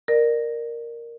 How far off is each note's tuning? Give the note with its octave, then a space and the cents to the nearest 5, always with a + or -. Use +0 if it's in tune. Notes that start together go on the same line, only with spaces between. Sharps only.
A#4 +0 D5 +35